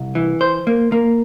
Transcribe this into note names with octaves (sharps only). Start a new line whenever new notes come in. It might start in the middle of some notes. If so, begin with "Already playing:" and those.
Already playing: C2
E3
C5
A#3
A#3